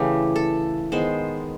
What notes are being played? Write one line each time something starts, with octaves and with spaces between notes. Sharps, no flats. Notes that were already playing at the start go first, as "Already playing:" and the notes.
Already playing: C#3 E3 A3 G4
A4
D#3 G#3 B3 C5